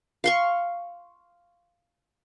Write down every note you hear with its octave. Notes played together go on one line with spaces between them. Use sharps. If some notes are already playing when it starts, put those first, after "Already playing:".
F5 C6 C#6